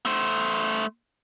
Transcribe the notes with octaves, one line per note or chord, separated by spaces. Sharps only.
A3 C5